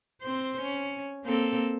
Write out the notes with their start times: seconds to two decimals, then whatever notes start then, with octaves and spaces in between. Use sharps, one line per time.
0.22 C4 C5
0.61 C#4
1.25 A#3 C4 A4